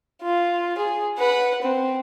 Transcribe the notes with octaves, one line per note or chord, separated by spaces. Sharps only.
F4
G#4
B4 F#5
C4